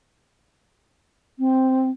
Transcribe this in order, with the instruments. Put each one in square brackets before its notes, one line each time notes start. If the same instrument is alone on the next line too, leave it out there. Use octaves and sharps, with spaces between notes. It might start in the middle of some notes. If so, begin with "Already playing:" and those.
[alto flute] C4